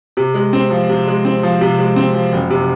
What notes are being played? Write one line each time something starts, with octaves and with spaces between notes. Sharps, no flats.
C3
G#3
C4
F3
C3
G#3
C4
F3
C3
G#3
C4
F3
F#1
C3